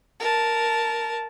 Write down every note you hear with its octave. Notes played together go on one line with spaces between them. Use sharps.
A#4 A5